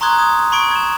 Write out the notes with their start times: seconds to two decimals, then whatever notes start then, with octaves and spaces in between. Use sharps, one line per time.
0.01 A#5 C6 C#6 D#6 F#6 G#6
0.19 D#6 G#6
0.52 B5 C#6 G#6 D7
0.71 G#6 E7